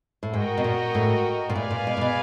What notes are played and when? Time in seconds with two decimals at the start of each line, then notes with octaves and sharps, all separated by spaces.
0.23 A2
0.33 G#2 F#4 A#4 D#5 G5
0.58 B2
0.64 A#2
0.95 A2
1.49 A#2
1.55 A2 G#4 B4 D5 F5 G#5
1.71 A#2
1.87 B2
1.97 A#2
2.01 B2